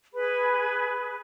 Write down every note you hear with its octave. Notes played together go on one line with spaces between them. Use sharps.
G#4 B4 B5